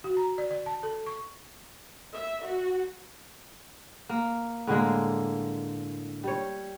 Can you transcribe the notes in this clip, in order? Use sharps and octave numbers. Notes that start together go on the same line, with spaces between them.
F#4
A#5
D5
D5
A5
A4
C#6
E5
F#4
A#3
A2 D3 G#3 A#3
G3 C#5